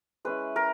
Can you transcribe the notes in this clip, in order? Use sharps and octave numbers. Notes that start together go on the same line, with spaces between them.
G#3 C#4 E4 B4
A#4